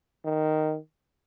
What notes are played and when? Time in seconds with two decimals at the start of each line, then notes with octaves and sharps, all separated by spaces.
0.25 D#3